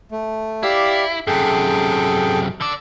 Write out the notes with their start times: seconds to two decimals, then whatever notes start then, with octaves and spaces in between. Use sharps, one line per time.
0.12 A3
0.63 E4 G4 D5 F5
1.27 F#2 C3 G#4 A4 G5
2.61 D3 D5 E6